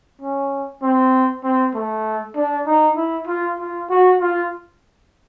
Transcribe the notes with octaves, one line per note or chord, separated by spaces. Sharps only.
C#4
C4
C4
A3
D4
D#4
E4
F4
F4
F#4
F4